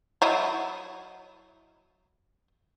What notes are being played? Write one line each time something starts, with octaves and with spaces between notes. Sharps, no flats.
F#3 E4 D#5